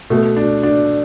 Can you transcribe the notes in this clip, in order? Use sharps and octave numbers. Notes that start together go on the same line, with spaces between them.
B2 A3
D4
D4